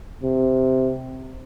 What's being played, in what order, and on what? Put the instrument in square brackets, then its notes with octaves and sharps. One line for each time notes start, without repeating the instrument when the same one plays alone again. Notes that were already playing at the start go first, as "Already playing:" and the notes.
[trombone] C3